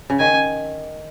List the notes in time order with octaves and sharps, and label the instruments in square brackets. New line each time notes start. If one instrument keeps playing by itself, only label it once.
[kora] C#3
[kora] D#3 [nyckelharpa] G#5